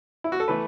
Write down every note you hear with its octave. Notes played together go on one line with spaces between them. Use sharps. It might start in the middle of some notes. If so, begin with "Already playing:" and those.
E4
F#4
A4
E3 A3 B4